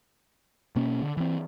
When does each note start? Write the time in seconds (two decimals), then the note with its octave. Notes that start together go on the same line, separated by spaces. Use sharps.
0.76 B2 A#3 C#4
1.01 D3
1.17 E3 C4